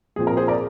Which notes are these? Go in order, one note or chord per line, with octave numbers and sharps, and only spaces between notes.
A#2 F3 C4 G#4
A#4
G#4 C5
A#4 D5